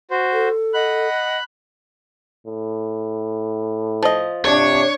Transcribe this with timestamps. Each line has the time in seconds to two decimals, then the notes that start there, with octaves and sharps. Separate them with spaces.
0.11 F#4 C5
0.32 A4
0.74 D#5 F#5 B5 F#6
2.47 A2
4.03 F3 D#5
4.45 C3 D4 C#5